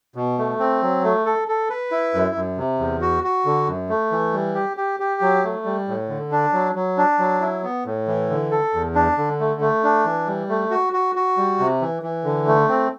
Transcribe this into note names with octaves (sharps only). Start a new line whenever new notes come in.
B2
A3
C4
F#3
A3
A4
A4
B4
E4
F#2
F#2
C3
E2
F#4
F#4
D3
F#2
A3
E3
G3
G4
G4
G4
F#3
A3
G3
A2
D3
D4
F#3
F#3
D4
F#3
E4
B3
A2
E3
D3
A4
E2
D4
D3
A3
A3
D4
E3
G3
A3
F#4
F#4
F#4
G3
C3
E3
E3
D3
A3
C4